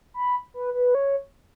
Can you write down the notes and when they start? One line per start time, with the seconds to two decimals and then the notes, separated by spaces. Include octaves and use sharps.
0.14 B5
0.54 B4
0.74 B4
0.95 C#5